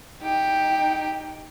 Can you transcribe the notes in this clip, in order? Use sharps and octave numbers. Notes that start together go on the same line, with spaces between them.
D#4 G4 G5